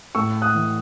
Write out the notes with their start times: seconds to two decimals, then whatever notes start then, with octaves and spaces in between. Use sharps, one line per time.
0.15 A2 C#6 E6
0.42 D#6 F#6
0.55 E3